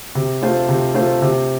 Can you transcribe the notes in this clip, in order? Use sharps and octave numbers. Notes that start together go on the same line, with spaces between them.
C3
A3 F4 C5
C3
A3 F4 C5
C3